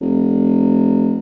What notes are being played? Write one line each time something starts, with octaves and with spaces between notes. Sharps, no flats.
F1